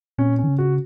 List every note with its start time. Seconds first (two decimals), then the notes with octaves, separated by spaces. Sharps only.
0.18 A#2 C#4
0.39 C#4
0.44 D#3
0.48 C#3
0.58 F#4